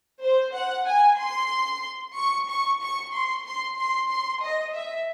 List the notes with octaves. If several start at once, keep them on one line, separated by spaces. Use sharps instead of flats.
C5
F#5
G#5
C6
C#6
C#6
C#6
C6
C6
C6
C6
D#5
E5